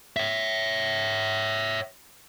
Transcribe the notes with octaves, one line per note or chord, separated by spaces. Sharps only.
C#5 E5